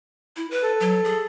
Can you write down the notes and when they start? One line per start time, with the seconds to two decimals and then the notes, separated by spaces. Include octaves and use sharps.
0.36 E4
0.51 B4
0.63 A4
0.80 F#3
1.05 G#4